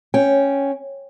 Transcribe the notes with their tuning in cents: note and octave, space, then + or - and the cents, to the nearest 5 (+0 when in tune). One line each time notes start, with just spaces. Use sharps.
C#4 +0 G5 +0